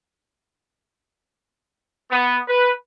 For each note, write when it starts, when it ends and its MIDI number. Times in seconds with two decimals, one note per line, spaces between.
2.11 2.39 59
2.49 2.72 71